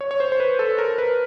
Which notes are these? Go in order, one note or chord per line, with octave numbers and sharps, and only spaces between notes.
C#5
C#5
C5
C5
B4
A4
A#4
B4